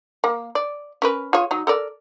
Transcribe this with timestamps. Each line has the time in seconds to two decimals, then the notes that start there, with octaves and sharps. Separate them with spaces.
0.24 A#3
0.55 D5
1.02 C#4 A#4 B4
1.33 F4 G#4 C#5
1.51 F#3 D#4
1.67 A4 A#4 D5